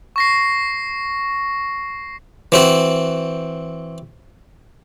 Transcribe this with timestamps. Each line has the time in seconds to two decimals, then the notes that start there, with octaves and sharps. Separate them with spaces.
0.16 C#6 A#6 C7
2.52 E3 C4 F#4